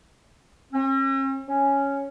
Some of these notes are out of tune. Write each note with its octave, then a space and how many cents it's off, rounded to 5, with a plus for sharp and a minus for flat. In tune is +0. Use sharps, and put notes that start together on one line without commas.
C#4 -45
C#4 +0